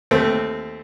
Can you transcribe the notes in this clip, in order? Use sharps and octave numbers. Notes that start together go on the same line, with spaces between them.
D#2 A3 C4